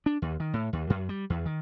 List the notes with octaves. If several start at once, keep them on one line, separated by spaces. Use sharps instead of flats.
D4
D#2
D#3
A2
D#2
F#2
G3
E2
D#3